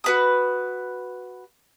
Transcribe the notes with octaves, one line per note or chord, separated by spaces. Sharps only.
F#4 B4 D#6